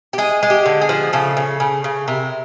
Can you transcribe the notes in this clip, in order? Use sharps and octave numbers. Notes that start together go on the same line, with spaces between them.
G4
G#3 G#4
G#3
G4
D3
G#4
F3
C#3 A4
C#3
C#3
C#3
C3 A#4